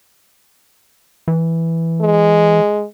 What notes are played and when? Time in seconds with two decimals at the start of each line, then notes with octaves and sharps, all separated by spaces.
1.28 E3
2.01 G#3